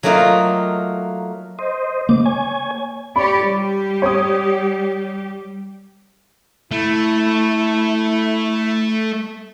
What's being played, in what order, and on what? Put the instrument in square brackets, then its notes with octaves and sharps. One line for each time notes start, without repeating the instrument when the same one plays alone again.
[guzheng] F#3 A3 A#3 D#4 F4
[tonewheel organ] C5 D#5
[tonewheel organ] C#3 D6 [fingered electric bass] A#3
[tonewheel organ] C#5 G#5
[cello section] G4 C#5 D5 [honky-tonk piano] B5
[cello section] G3 G4
[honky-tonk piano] C#5 D#6
[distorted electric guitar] A3 [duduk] E4